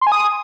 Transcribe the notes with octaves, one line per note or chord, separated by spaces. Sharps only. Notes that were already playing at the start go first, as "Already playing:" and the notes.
C6
G#5
D#6